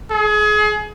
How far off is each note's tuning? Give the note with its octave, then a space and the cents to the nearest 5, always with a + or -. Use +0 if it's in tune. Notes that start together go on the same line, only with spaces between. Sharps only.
G#4 +30